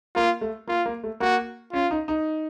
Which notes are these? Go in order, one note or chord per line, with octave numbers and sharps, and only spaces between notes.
A#3 F4
A3
A#3 F4
A#3
A3
A#3 F#4
C#4 F4
D#4
D#4